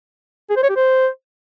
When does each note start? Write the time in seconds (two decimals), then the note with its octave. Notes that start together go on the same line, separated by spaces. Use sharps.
0.50 G#4
0.57 C5
0.63 C#5
0.70 G4
0.76 C5